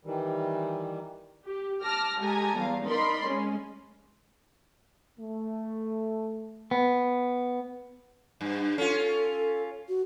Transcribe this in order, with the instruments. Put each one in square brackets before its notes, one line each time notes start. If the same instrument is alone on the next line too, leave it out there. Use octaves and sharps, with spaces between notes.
[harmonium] D#3 E3 G3
[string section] G4
A5 D6 F6 A#6
G#3 G4 A4 G#5 A#5
E2 G3 F5
D#4 A#4 D5 B5 C6
G#3 C#4
[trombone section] A3
[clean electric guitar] B3
[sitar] G2
[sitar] C#4 F4 [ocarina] A4
[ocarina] F#4